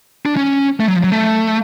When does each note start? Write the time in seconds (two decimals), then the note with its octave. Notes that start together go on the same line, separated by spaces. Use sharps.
0.26 D4
0.37 C#4
0.80 A3
0.88 F#3
0.96 F3
1.04 F#3
1.12 A3